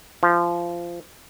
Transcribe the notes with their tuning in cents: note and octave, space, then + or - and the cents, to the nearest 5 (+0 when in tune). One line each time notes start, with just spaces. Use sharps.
F3 -20